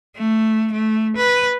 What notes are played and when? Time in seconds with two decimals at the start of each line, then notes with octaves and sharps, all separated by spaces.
0.16 A3
0.72 A3
1.16 B4